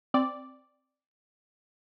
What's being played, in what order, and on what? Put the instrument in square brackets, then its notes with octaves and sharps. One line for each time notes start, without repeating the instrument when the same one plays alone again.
[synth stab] C4 D5